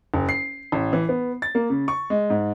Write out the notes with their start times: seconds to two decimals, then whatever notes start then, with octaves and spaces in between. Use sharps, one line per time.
0.14 F#1
0.29 C7
0.72 A1
0.93 E3
1.09 B3
1.42 A6
1.55 A#3
1.70 C#3
1.88 C#6
2.10 G#3
2.30 G#2